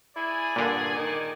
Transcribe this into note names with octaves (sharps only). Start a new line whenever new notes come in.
E4 G#4 D5 G#5
G2 A#2 D3
D#3